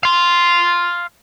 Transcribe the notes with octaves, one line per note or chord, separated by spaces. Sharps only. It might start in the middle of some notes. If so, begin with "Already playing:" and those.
F5 C6